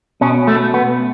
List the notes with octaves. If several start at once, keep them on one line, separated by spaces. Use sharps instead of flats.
B2 C#4
A3
B3